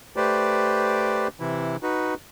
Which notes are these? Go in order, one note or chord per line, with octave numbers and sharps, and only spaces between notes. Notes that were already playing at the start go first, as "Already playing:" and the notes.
A3 G4 B4 C5 D5
C3 E3 E4
D#4 F#4 B4